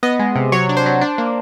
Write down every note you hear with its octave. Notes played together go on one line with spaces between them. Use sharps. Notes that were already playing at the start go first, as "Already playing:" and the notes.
B3 D#5
G#3
C3
F#3 C#5
D4
C5
F#3
D4
A#3